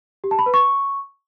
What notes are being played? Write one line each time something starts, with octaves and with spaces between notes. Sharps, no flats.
G4
A5
B5
B4
C#6